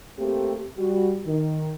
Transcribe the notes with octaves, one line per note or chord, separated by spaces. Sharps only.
A3 A#3 C4 G4
G3 F#4
D#3